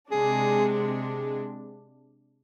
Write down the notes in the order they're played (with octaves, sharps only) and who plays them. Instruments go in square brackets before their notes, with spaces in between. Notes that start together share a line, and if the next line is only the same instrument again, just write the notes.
[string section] C3 G#3 D4 [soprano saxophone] G#4